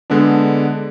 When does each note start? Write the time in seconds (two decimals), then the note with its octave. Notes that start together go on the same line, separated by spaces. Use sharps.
0.10 D3 G#3 B3 D4